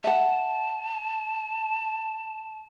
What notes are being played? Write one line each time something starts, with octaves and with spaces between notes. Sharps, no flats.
E5 F#5 A5